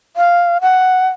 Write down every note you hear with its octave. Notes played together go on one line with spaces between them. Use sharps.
F5
F#5